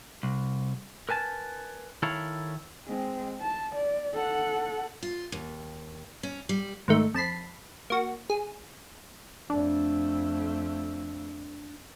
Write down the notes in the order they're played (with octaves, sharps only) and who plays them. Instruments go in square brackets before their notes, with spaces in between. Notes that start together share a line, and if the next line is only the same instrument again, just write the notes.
[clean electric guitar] C2
A#4 B4 G#5 A5
D#3 E4 A4 A#4 C#5 F5
[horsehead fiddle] G#3 C4
A5
D5
A4 F#5
[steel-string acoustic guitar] F4
D#2
C#4
G3
[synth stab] G#2 D#3 A3
F2 A5 B5 C7
A#3 F#4
G#4
[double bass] F2 A3 [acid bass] D4